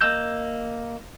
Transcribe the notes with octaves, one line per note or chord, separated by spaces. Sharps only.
A#3 D#5 E6 G6